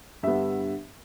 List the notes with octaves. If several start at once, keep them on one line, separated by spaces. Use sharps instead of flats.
G2 D3 G3 B3 E5